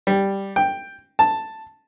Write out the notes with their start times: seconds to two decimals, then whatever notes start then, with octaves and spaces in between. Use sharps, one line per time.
0.07 G3
0.56 G5
1.19 A5